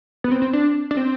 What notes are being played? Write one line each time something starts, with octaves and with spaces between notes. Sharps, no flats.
B3
C4
C4
D4
D4
C4